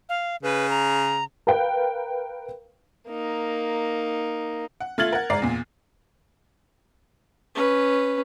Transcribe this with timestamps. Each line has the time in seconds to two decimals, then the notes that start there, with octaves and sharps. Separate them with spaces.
0.09 F5
0.43 C#3 B4
0.70 A#5
1.47 A#4 B4 F5 G5
3.08 A#3 D#4
4.80 F#5
4.98 A3 F4 F6 G#6 A6 F#7
5.13 A#4 F#5
5.30 G#2 D5 A#5 C7
5.42 E2 A#2
7.55 C#4 B4